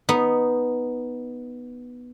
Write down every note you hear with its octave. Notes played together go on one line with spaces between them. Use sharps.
B3 D#4